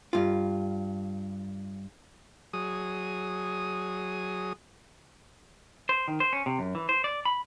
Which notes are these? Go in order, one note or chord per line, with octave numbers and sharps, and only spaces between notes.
G2 F4
F#3 G#4 D#6
C5
D#3
C5
C#4
C3
F#2
E3
C5
D5
B5